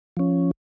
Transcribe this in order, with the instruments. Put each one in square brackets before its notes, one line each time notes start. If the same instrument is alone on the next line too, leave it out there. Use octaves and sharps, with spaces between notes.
[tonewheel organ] F3 C#4